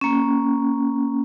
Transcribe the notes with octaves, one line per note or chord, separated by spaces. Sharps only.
A#3 C#4